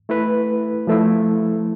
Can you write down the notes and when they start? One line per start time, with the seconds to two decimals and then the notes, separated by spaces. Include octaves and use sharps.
0.09 A3 E4 B4
0.87 F3 A3 E4